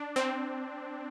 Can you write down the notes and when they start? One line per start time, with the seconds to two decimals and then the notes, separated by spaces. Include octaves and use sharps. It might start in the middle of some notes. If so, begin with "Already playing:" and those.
Already playing: D4
0.16 C4